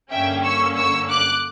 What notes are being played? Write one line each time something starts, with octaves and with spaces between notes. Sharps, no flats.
G2 D3 A#3 C#4 E5 G5
C#6 E6
C#6 E6
D6 F#6